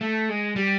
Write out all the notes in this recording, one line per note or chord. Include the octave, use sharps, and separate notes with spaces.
A3
G#3
G3